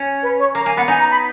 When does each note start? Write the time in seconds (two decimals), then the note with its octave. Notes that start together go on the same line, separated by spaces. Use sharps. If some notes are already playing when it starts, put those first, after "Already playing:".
Already playing: C#4
0.22 B4
0.39 C#5
0.55 A#3 A#5
0.66 A#3 G#5
0.77 B3 F#5
0.88 D#4 G#5
0.99 A#5
1.10 B5